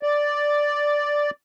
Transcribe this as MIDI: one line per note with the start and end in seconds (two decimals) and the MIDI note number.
0.03 1.30 74